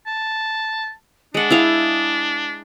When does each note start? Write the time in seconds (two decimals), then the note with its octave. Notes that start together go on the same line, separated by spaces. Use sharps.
0.06 A5
1.34 G#3 D4 F#5
1.50 E4 G#4 F5